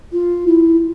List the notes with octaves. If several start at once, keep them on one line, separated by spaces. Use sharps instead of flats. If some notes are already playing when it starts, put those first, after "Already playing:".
F4
E4